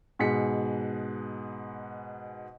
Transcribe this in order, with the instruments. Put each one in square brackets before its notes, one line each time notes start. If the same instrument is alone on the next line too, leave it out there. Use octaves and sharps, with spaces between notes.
[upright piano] G#2 B2 G#4 B6 C#7